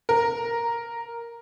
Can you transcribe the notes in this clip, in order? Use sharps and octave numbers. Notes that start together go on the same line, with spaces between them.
A#4